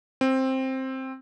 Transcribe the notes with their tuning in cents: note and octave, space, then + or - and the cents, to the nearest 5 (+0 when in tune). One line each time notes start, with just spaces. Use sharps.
C4 +10